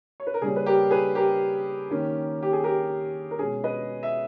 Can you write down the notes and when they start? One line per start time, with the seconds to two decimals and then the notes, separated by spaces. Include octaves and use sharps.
0.20 C#5
0.27 B4
0.34 A#4
0.41 C#3 G3 A#3 C#4 G#4
0.56 B4
0.66 G4 A#4
0.91 G#4 B4
1.15 G4 A#4
1.91 D#3 A#3 C#4
2.43 G4
2.53 G#4
2.64 G4 A#4
3.31 A#4
3.39 B2 G#3 C#4 G#4
3.64 B4 D#5
4.03 E5